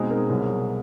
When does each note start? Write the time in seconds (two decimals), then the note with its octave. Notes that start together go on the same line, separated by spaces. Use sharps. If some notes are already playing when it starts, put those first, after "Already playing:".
Already playing: B2 G#3 C4 D#4
0.10 G#4 A#4
0.29 C2 B2 F#3